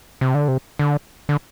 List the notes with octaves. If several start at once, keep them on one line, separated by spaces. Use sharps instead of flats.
C3
D3
C3
D3
D3